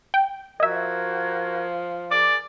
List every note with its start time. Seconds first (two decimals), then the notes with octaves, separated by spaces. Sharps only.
0.14 G5
0.60 F3 F#4 A#4 D#5 E5 G#6
2.11 G#4 A#4 D5 G#5 D6